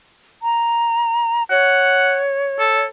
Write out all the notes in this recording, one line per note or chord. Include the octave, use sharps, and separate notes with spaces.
A#5
C#5 F#5
A4